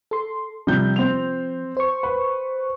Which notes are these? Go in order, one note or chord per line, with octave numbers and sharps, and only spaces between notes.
A4 C6
C3 F3 G3 G6
C4 F7
C5 C#6
B4